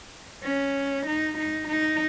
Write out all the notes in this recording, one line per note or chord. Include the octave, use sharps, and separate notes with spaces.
C#4
D#4
D#4
D#4